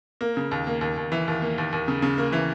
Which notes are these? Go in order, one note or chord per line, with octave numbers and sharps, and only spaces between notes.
A#3
C#3
D#2
A#3
D#2
D#2
E3
D#2
A#3
D#2
D#2
C#3
C#3
A#3
E3